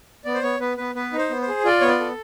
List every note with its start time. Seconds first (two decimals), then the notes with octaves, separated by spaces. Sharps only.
0.25 B3 D5
0.34 C5
0.42 B3 C#5
0.60 B3 B4
0.77 B3 B4
0.95 B3 B4
1.13 D#4
1.18 C5
1.30 B3
1.42 C5
1.48 G#4
1.65 F4 D5
1.81 B3 C#5
1.88 D5
2.00 A4